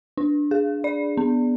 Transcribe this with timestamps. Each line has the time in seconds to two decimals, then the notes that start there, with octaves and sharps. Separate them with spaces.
0.17 D4
0.51 G#4
0.84 D5
1.17 B3